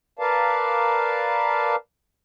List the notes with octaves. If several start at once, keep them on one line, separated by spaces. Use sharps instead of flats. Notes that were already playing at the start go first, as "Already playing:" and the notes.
A#4 B4 D5 F5 A5